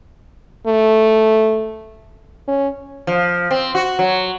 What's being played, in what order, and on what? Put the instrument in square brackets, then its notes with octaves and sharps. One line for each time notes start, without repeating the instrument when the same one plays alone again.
[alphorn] A3
C#4
[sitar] F3
C4
F#4
F#3